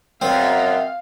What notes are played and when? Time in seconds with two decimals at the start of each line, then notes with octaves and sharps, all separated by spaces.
0.21 F#2 B2 C4 F5